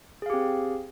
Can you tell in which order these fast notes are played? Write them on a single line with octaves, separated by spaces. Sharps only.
G#4 F5 G4 C4